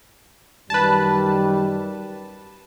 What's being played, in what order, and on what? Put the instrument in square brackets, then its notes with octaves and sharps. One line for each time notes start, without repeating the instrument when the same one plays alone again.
[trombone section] F#2 D#3 G3 [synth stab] B4 A5